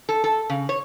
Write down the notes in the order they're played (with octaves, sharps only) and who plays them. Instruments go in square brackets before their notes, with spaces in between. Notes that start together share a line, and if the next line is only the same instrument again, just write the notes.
[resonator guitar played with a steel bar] A4
A4
C#3
C#5